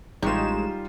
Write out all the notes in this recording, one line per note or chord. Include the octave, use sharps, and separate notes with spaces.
A1 G3 G#3 D#4 F4 G4 C#5 E7